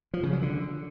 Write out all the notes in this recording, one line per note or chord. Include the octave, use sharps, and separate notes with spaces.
F3
C#3
F#3
D3